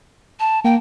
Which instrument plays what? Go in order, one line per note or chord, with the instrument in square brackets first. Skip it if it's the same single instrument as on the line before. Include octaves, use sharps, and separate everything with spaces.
[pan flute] A5
[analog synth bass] A#3 [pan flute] G5